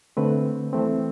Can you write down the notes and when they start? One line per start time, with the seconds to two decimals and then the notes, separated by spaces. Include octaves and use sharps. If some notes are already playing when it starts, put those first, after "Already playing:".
0.17 D3 A3 C4 B4
0.73 E3 A3 C4